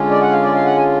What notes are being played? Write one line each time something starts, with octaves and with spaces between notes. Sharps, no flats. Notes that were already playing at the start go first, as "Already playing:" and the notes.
Already playing: D3 G#3 C#4 F4
D5
F#5
F5
D5
F5
F#5
G#5